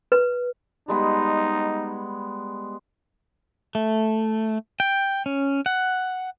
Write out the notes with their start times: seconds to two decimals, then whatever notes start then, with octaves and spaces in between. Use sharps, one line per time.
0.12 B4
0.88 G3 G#3 B3 D#4
3.75 A3
4.80 G5
5.26 C#4
5.66 F#5